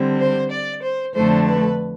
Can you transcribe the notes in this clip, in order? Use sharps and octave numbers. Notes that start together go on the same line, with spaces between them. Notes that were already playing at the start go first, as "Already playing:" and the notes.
Already playing: D3 G3 C4
C5
D5
C5
F2 D3 A3 D4 C5
B4